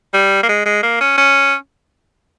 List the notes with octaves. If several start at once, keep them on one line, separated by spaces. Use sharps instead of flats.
G3
A#3
G#3
G#3
A#3
C#4
C#4